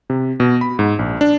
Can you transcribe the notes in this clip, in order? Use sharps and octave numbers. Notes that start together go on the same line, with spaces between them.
C3
B2
B5
G#2
A#1
D4